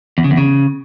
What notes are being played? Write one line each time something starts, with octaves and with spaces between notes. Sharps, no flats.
E2
C#3
E2
C#3